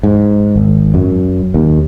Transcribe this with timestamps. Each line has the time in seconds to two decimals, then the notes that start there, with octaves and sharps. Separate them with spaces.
0.03 G#2
0.56 G#1
0.94 F#2
1.54 D#2